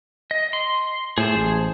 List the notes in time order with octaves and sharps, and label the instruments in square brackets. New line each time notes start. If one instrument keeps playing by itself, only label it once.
[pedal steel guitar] D#5
C6
[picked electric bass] A2 [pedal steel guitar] G#4 C5 A5
[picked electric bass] A1